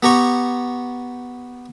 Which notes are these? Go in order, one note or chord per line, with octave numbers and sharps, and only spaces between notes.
B3 G4 A#5 C#6